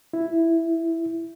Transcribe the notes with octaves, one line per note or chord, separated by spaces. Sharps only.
E4